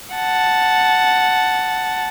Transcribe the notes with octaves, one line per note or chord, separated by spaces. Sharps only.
F#5 A5